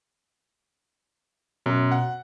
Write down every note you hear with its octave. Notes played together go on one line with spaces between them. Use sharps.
F#2 B2
F#5